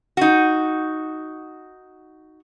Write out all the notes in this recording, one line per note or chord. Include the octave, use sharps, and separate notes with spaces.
D#4 F#4